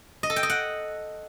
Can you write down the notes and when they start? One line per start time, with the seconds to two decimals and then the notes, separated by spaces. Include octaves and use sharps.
0.23 D#5
0.30 A4
0.36 G5
0.43 D#5
0.50 F#5